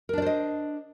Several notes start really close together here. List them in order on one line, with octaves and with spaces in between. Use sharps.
A#4 D4 D5 C5 D#5